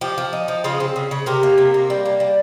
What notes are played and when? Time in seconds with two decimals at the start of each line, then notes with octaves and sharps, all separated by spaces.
0.01 F3 G4
0.18 F3
0.33 D#4
0.48 F3
0.64 C#3 F4 G#4
0.80 C4
0.96 C#3
1.11 C#3
1.26 C3 G4 A#4
1.43 A#3
1.58 C3
1.74 A#3
1.90 G3
2.06 A#3
2.20 G3